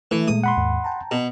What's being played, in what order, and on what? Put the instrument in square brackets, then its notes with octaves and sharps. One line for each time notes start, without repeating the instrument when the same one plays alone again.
[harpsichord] E3 [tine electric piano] A3
[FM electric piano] A#2 G#3 [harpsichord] D#6
[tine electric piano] F#5 B5 C6
[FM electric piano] D#2 G#2
G5 A5 A#5
[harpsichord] B2